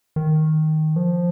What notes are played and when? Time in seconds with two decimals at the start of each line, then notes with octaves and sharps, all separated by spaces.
0.16 D#3
0.96 F3